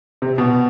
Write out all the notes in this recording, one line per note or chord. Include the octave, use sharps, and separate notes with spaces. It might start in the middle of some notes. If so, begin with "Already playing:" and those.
C3
B2